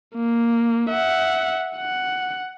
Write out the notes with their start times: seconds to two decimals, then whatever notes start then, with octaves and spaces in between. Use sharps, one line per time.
0.16 A#3
0.90 E5 F#5
1.76 F#5